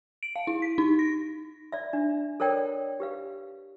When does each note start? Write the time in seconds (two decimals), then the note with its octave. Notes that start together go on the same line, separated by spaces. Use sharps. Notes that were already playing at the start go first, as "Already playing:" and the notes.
0.23 D7
0.36 F5
0.47 E4
0.62 B6
0.78 D#4
0.99 A#6
1.72 D5 E5
1.93 D4
2.40 A4 A#4 C#5 D5 G5
3.00 G4 B4 F5